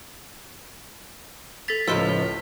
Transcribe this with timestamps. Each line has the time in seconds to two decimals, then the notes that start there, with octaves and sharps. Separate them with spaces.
1.68 A4 A6 B6 F7
1.88 C#2 A2 F3 D#5 C6 E6